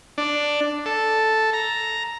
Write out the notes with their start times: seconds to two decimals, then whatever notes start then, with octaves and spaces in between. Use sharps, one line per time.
0.18 D4
0.86 A4
1.53 A#5